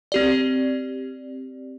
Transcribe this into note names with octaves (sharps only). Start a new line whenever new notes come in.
C4 G4 D5